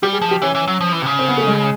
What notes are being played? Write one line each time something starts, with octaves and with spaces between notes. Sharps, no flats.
G3 G4
G#4
F3
G4
E3 C#4
E3
F#3
F3
E3
C3
C#3
C4
B3
A3
G#3